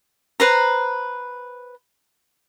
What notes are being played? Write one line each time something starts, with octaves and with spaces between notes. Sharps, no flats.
B4 C5 A#5